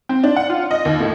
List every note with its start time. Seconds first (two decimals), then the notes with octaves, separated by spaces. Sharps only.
0.09 C4
0.24 D4
0.36 F#5
0.50 F4
0.71 D#5
0.85 D#2
1.00 A2